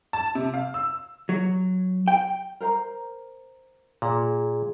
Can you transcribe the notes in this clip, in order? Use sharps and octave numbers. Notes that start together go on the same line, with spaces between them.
A5
C3
F5
E6
F#3
G5
A#4 C5 A#5
A#2 G#4